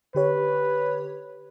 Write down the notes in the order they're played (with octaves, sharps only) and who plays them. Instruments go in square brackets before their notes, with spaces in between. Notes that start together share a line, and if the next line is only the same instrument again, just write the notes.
[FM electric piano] D3 G4 C#5 [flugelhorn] B4